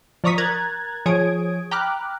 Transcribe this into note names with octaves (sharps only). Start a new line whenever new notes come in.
F3 D5 A#5 C#6 D#6 B6
A#4 A#5 F#6 G#6 A6
F3 G#4 C#5 D#6 G#6 D7
G5 A#5 B5 D6 F6 F#6